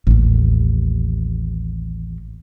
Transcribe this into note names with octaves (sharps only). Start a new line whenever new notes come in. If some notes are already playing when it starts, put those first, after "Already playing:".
A1 D#2